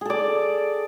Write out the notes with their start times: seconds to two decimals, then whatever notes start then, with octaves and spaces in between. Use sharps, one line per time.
0.01 G#4
0.05 A4
0.10 D5